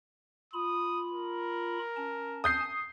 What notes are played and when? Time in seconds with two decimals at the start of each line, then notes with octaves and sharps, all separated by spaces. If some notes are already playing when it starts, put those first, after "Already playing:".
0.53 F4 B5 D#6
1.13 A#4
1.96 C#4 A5
2.44 D#6 G6 C7